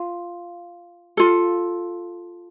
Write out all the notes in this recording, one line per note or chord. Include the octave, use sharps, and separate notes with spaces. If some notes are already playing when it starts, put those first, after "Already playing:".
Already playing: F4 F5
F4 A4